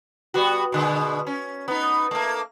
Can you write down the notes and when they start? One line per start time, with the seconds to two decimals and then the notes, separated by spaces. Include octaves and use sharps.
0.34 G3 B3 F#4
0.72 B2 D3 G#3
1.27 C#4
1.68 B3 D#4
2.11 A3 A#3